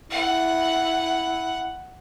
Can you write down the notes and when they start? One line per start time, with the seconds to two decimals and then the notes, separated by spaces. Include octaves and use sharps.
0.11 E4 F#5